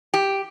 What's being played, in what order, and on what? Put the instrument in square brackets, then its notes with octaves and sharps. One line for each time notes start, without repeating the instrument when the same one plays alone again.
[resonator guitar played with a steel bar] G4